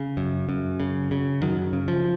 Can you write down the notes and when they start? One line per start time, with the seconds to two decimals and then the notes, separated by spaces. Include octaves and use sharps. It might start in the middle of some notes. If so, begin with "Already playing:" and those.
Already playing: C#3
0.17 F#2
0.49 F#2
0.80 C#3
1.11 C#3
1.41 F#2 D#3 F#3
1.73 C#3
1.88 F3